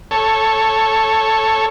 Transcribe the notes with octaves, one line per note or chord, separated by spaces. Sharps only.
A4 C#5